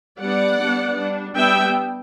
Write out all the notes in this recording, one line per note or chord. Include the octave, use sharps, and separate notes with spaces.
G3 B3 D4 D5 F#5
G3 B3 D4
G3 D4
G3 B3 D4 E5 G5